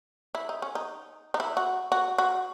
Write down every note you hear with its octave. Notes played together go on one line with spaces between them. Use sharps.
E4
D#4
C#4
D#4
D#4
E4
F#4
F#4
F#4